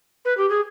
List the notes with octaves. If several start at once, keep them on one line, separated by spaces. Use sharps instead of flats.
B4
G4
G#4